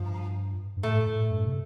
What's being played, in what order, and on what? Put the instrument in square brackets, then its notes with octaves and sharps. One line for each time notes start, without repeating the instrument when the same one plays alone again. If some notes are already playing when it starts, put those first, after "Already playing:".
Already playing: [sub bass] G2 [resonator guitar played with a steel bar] F3
[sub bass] G2
[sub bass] A2 [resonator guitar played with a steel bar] A3
[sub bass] A2
G2
C3